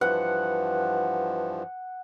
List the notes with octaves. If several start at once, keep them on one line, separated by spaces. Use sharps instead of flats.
G2 E3 F3 B4 F#5